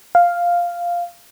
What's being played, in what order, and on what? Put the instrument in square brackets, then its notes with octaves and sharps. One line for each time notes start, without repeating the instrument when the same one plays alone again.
[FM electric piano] F5